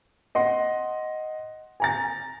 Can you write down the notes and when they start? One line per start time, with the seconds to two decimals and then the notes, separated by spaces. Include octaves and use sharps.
0.35 D#5 F#5 C6
1.80 G#5 A#5 A6